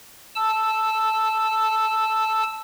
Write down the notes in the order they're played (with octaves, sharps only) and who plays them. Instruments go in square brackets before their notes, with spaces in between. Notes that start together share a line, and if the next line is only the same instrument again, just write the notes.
[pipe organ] A5 E6